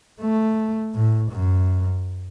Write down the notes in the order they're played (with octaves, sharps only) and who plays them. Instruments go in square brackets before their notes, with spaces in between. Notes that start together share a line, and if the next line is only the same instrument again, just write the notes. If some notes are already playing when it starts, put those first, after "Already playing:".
[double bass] A3
A2
F#2